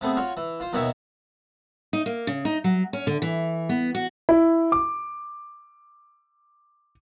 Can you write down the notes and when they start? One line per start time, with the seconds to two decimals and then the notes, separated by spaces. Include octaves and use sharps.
0.01 C3 A3 B3 G#4
0.16 F4 F#4 C#5
0.37 E3
0.60 F4 C5
0.73 D#2 B2 D#3 F#4 C#5 E5
1.93 D#4
2.06 A#3
2.27 C#3
2.45 D#4
2.64 F#3
2.93 C#4
3.07 D3
3.22 E3
3.69 B3
3.95 F#4
4.29 E4
4.72 D6